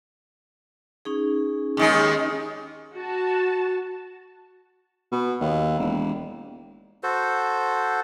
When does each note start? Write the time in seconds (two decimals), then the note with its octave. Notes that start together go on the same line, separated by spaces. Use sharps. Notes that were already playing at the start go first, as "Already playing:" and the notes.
1.05 C#4 D#4 G#4
1.77 D#2 D#3 G#3
2.96 F#4 A5
5.12 B2
5.41 D#2
5.79 E1
7.03 F#4 A4 C5